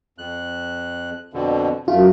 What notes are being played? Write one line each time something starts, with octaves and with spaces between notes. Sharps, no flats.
F2 F#6
F2 B2 D3
F#2 A3 F4